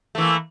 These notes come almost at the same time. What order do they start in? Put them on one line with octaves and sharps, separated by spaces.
A3 E3 A#3